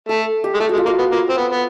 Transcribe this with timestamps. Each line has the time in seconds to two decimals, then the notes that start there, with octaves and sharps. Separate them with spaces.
0.09 A3 A4
0.44 G4
0.54 G#3
0.60 A3 G4
0.69 G#3 F#4
0.78 F4
0.85 A#3 F#4
0.99 B3
1.12 A#3 F4
1.29 C4
1.37 B3
1.52 B3